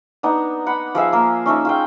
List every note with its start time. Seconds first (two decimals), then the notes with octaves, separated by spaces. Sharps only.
0.23 B3 D4 D#4
0.67 F#5 B5
0.95 F3 G#4 E5 F5
1.13 A#3 A#4
1.46 C#4 D#4 E5 A5
1.65 F4 G#4 G5